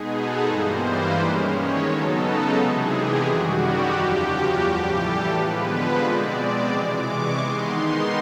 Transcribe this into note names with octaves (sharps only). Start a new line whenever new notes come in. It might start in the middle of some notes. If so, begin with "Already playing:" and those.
Already playing: B2 G#3 B3 D#4 G#4
A4
G2 E3 G3 A#3 C5
B4
D#3 G#3 C#4
C#5
C#3 F#3 B3 D#4 A4
C3 E3 G#3 G#4
G4
F#2 D#3 G3 F#4
G4
E2 C#3 F3
F#4
A2 E3 G3 G4
A4
D3 F3 G#3 B3 B4
C5
B2 G#3 C4 D5
C3 E3 G#3 D6
C#6
D#3 G#3 B3 D#4 C6